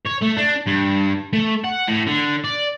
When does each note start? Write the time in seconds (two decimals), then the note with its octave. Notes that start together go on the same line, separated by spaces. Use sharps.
0.06 C#5
0.22 A3
0.37 D4
0.67 G2
1.33 A3
1.64 F#5
1.87 A2
2.07 D3
2.45 D5